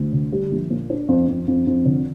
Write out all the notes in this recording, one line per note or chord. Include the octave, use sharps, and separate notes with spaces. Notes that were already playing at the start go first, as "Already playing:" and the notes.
Already playing: D2
D3
G3
A#1
A#2
D4
F2
F2
F2
F2
D3